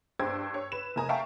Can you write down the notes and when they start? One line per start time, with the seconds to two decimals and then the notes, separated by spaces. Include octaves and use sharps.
0.19 G2 C5 G5 E6 G#6
0.54 C#5
0.72 B4 E7
0.96 F1 A#4 G#5 A#5 D#6
1.09 E5 F5 G5 A5 A#5 C#6